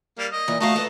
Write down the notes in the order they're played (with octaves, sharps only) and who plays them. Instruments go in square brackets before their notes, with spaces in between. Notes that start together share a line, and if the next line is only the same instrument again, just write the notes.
[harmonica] G3 A#3
D#5
[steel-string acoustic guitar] A#2 E3 A#4
[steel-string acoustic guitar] A3 F#4 F5 [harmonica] D#5 A5 A#5
[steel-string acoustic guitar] A4 B4